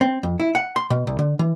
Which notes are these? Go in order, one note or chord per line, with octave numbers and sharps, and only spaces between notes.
C4
F2
E4
F#5
C6
B2
C2
D3
E3